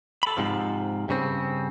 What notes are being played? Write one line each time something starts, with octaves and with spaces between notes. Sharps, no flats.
A4 B5
G#2 C3 F3
G2 C#3 C4